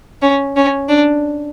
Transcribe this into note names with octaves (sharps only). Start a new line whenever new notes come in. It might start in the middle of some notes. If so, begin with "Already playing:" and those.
C#4
C#4
D4